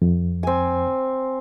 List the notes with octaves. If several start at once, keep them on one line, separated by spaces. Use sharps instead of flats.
F2
C4 G#5